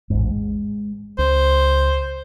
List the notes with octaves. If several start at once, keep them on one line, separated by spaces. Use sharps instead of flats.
A1 E2 G#2
G#3
C#2 C5